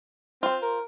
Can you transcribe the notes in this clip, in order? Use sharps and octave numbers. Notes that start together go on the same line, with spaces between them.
C4 F4 C5
A#4